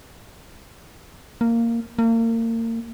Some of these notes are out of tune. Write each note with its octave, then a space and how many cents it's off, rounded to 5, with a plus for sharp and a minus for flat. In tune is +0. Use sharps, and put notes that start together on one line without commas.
A#3 -10
A#3 -35